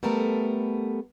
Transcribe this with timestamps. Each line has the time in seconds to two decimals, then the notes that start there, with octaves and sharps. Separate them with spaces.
0.03 G3 A3 B3 A4 A#4